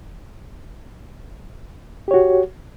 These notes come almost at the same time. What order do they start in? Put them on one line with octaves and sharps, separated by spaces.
G4 C#5 F#4